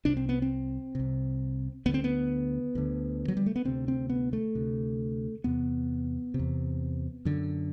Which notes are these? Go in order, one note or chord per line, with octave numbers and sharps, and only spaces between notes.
C2 C3 D4
C4
B3
C4
C2 C3
D2 D3 B3
C4
B3
D2 D3
F#3
G3
A3
B3
D2 C3 C4
C4
B3
A3
D2 C3
E2 C3 B3
C3
E2
F#2 D3